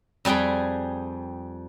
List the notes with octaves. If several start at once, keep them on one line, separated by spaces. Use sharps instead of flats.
F2 G3 G#4 G5 B5